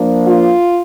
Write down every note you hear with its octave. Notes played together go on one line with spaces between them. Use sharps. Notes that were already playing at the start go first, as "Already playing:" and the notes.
Already playing: F3 A#3 D4
F4